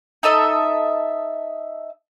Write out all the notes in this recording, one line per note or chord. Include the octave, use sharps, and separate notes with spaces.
D#4 A4 D#5 E5